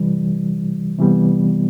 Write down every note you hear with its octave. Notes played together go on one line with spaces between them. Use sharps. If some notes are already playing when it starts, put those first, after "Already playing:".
Already playing: C3 E3 G3
C3 E3 G3 B3